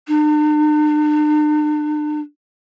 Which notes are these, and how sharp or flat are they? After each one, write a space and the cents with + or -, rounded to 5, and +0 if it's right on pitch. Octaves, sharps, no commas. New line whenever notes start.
D4 +45